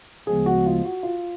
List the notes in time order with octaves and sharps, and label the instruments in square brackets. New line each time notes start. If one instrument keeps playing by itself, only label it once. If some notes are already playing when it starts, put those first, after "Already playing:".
[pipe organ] D2 C#3 F3 G#3 B3 [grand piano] G#4
[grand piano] F#4
F4
F#4
F4